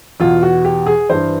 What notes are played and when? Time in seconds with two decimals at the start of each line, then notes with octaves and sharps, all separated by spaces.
0.20 E2 B2 F4
0.43 F#4
0.65 G4
0.86 G#4
1.09 G2 E3 C5